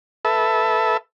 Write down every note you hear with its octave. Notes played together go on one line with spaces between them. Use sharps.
A4 B4 E5